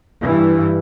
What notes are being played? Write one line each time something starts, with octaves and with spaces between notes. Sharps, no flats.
G2 E3